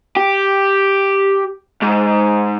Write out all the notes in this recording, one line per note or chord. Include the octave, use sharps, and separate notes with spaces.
G4
G#2